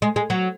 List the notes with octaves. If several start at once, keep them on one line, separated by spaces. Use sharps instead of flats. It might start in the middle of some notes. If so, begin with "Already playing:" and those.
G#3
G#3
F#3